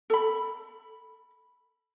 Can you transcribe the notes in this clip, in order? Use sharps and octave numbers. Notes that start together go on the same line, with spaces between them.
A4 B5